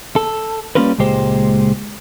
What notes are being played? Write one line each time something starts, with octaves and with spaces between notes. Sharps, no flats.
A4
G3 A#3 C#4 F4 A#4 B4
C#2 A#2 G#3 G4 C5